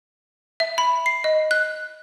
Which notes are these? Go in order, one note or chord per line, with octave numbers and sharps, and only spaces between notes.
E5
B5
C7
D#5
F#6